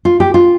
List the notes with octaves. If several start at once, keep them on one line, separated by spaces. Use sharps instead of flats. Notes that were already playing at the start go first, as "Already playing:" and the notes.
F4
G4
F4